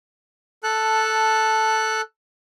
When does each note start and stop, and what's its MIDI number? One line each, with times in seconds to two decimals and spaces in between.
0.64 2.01 69
0.64 2.01 81
0.64 2.01 90